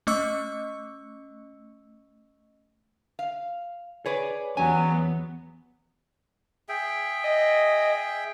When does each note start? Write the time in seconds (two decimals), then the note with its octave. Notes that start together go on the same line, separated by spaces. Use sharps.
0.07 A3 C#4 D#5 C#6 E6 C#7
3.19 F5
4.06 G#4 B4 C#5 D5
4.57 E2 F#3 B3 C#4 G4 G#5
6.69 G#4 E5 G5
7.24 D#5